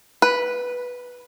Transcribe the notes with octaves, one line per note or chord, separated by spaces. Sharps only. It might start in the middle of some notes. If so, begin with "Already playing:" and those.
B4